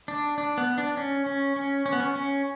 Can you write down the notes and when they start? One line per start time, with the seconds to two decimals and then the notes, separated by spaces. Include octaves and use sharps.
0.08 D4
0.38 D4
0.58 B3
0.78 D4
0.97 C#4
1.26 C#4
1.56 C#4
1.86 C#4
1.93 B3
2.00 C#4
2.15 C#4